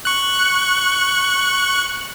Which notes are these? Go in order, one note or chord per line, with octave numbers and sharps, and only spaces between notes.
C#6 F#6